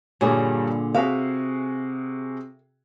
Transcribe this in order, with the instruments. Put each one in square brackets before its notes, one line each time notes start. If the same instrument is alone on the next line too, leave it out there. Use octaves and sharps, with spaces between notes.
[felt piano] G2 G3 C#5 [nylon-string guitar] A#2 D3 G#4
[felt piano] C3 F#4 G#4 [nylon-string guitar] E5 F5